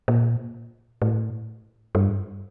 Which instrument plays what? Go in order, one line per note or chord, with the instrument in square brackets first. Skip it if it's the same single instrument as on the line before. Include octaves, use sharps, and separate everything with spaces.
[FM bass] A#2
A2
G2